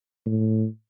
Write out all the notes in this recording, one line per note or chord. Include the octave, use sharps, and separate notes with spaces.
A2